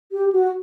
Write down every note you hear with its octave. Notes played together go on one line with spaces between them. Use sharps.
G4
F#4